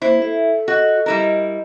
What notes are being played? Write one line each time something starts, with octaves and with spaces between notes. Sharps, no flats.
A#3 E4 C5
A4 E5
F#4 D#5
G3 E4 A#4